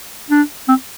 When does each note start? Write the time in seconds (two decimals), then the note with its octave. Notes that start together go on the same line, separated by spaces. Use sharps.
0.30 D4
0.68 C4